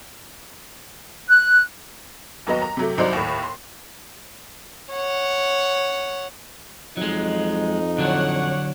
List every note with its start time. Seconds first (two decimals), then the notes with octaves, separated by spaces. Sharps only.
1.28 F#6
2.47 D#2 F#3 B3 D#5 A#5
2.62 A#5
2.77 C3 F#3 A3
2.98 C2 F#3 D#4 C5 D5
3.13 D#2 A2
3.43 C6
4.93 C#5 F#5
6.97 F2 F#3 G#3 D#4
7.98 D3 F#3 D4 C#5 F#5